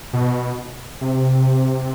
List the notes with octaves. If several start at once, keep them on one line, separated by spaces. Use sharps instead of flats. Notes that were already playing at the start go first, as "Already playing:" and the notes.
B2
C3